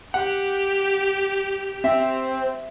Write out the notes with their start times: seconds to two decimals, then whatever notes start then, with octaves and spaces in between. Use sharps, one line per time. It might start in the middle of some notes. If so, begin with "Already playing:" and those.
0.14 G4 F#5
1.84 C4 E5